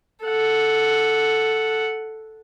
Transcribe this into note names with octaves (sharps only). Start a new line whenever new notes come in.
A4 F#5